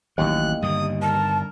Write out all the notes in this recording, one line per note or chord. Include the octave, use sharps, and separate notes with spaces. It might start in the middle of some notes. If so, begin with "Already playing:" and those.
A1 D#2 D#3 F#3 F#6
G2 D3 D#3 D#6
A#4 A5